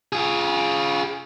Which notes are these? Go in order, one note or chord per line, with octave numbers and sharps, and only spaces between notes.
F4 G#4